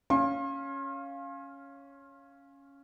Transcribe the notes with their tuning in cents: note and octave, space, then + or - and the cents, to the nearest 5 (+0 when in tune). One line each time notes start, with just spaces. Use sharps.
C#4 +0 F5 +0 C6 +40